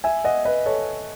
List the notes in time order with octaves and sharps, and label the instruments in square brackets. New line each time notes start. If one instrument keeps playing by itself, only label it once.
[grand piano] E5 G#5
D#5 F#5
B4 D#5
A4 C#5